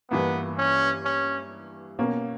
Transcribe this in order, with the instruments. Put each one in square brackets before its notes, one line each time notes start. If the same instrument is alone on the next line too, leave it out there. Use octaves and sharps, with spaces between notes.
[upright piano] G2 E3 A#3 [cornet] B3
[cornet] C#4
C#4
[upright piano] B2 A#3 C#4